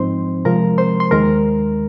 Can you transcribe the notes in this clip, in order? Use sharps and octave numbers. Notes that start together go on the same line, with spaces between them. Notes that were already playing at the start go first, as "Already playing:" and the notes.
Already playing: G#2 F3 C4 D#4 C5 C6
C3 F3 G#3 A#4 A#5
C5 C6
C6
D#2 D#3 G#3 A#4 A#5